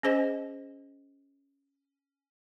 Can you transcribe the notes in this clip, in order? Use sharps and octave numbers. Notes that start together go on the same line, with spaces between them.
C#4 G#4 C5 D#5 G#5